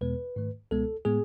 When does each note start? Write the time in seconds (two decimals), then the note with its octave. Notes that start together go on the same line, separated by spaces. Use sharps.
0.01 E2 B2 G#3 B3 B4
0.36 G#2 D#3 A3
0.71 C#2 B2 G#3 B3 A4
1.05 A2 G#3 B3 G#4